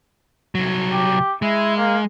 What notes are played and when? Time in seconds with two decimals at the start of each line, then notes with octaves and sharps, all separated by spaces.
0.55 C2 F#3
0.93 G4
1.42 G#3 E4
1.77 A#3